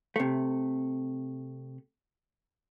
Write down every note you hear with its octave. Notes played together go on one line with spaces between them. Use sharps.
C3 A3